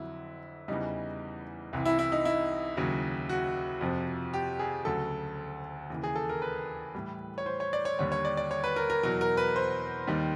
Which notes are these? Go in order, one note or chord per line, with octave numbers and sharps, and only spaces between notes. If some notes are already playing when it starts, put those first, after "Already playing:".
Already playing: F2 D3 F#3 E4
E2 C#3 E3 G3 D#4
C2 C3 E3
E4
E4
D#4
E4
D#2 C#3 F#3
F#4
F2 C3 F3
G4
G#4
D2 C#3 F#3 A4
D#2 C#3 E3
G#4
A4
A#4
B4
A2 E3 G3
C#5
C5
C#5
D5
C#5
D#2 D3 G3 C#5
C#5
D5
D5
C#5
B4
A#4
A#4
E2 B2 F#3 A#4
A#4
B4
C5
D#2 D#3 G3